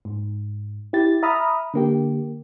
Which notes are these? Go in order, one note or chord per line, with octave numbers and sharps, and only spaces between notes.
G#2
E4 G4 A6
E5 A#5 B5 D#6 F6
D3 A#3 G4